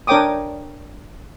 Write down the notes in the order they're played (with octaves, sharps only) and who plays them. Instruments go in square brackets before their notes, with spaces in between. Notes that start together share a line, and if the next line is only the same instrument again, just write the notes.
[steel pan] D4 A#4 C#5 G5 D6 D#6